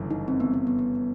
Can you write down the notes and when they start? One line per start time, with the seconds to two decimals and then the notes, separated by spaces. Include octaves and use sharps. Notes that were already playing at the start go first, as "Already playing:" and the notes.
Already playing: G1 F#2 C#3 E3
0.10 D#4
0.28 C4
0.40 B3
0.54 B3
0.67 B3
0.79 B3